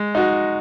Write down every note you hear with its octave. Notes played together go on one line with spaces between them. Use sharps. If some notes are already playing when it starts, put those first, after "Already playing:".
Already playing: G#3
D#4 F#4